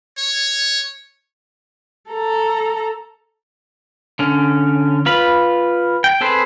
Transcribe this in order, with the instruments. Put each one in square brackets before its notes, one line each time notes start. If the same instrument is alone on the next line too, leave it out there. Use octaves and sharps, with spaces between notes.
[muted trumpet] C#5
[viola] A4 A#5
[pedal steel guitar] D3 C#4
F4 B4 B5
G5
C4 G#4 A4 B4 C5